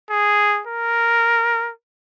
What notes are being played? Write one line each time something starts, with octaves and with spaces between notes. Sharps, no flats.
G#4
A#4